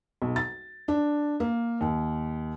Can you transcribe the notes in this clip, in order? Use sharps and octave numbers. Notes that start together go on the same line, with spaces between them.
B1
A6
D4
A#3
D#2